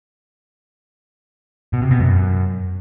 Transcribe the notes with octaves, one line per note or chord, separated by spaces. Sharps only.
B2
C3
B2
F#2